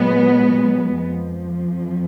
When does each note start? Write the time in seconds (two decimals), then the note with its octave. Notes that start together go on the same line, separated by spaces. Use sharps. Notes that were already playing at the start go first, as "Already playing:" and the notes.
Already playing: A#2 F#3 G#3 B3
0.96 F2 F3